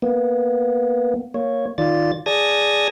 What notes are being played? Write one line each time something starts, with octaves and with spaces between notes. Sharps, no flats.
A#3 B3
A#3 C#5
D#3 F4 D5 A6
G#4 D5 A5 D#6 G#6 A#6